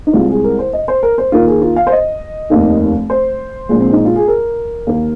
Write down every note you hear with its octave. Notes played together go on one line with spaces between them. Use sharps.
D#4
C2 C3 G#3 F4
G#4
A#4
C5
D#5
C5
A#4
C5
D#2 D#3 A#3 F4
G#4
F4
F5
C5
D#5
F1 D#2 D#3
C5
A#1 A#2 G#3
C4
D#4
F4
G#4
A#4
D#2 D#3 A#3